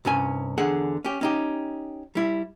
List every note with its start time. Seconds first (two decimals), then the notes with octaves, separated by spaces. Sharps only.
0.05 C2 G2 C#4 G#5
0.58 E2 D3 G#4 F#5
1.05 C#4 G4
1.21 C#4 D#4 G4
2.15 G3 E4